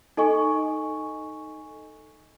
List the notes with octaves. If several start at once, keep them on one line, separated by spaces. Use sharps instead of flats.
D#4 A4 D#5 G#5 C#6